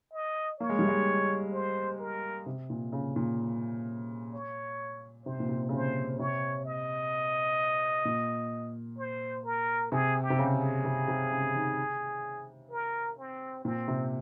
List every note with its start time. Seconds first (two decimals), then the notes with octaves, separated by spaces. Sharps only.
0.13 D#5
0.60 A#3 C#5
0.69 G#3
0.79 G3
0.88 G#3
1.53 C5
2.00 A#4
2.46 C3
2.70 A#2
2.92 C#3
3.16 A#2
4.33 C#5
5.26 C3 C5
5.40 A#2
5.49 C3
5.69 C#3
5.72 C3 C5
6.19 C3 C#5
6.65 D#5
8.05 A#2
8.98 C5
9.45 A#4
9.92 C3 G#4
10.22 G4
10.30 C3
10.38 C#3
10.54 G#4
10.85 C3
11.08 C3
11.31 C#3
11.55 D#3
12.71 A#4
13.18 C4
13.64 A#2 C4
13.88 C3